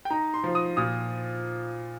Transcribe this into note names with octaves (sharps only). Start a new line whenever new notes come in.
G5
D#4 A#5
C6
F3
D#6
A#2 D#6